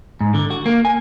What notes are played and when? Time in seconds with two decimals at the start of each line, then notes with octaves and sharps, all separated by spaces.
0.21 G#2
0.34 D3
0.50 F#4
0.66 A#3
0.85 G#5